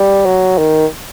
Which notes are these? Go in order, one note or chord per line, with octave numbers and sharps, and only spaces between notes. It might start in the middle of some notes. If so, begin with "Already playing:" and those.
Already playing: G3
F#3
D#3